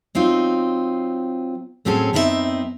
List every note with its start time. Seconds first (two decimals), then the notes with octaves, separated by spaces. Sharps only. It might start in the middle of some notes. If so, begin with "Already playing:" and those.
0.15 F#3 C4 D#4 F4
1.85 A2 F#3 C4 C#4 G#4 A4
2.13 F#2 B3 C4 D#4 A4 E5